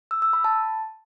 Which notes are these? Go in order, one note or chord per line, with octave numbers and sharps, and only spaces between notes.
E6
E6
B5
A5